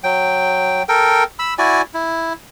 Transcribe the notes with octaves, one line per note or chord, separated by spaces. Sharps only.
F#3 G5
A4 A#4 G5
B5 E6
E4 F#4 D5 G#5
E4